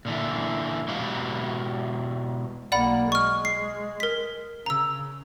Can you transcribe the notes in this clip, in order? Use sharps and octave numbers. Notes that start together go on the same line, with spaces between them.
A#2 D3 E3
B2 G#3 G4 B4 F5
B1 A#3 D5 F#5 B5
G#3 C#6 F6
C7
A#4 B6
C#3 A#5 E6